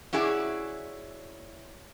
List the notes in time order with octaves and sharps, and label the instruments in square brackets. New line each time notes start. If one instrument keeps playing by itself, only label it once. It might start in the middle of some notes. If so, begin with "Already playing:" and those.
[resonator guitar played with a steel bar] C#4 E4 F#4 G#4 D5